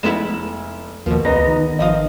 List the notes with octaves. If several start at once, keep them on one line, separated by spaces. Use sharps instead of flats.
F1 G#3 B3 E4 E7
D#2 B2 F3 A#3
C#2 B3 D#5 A#5
D#3
G#1 F3 D#5 F5 D#6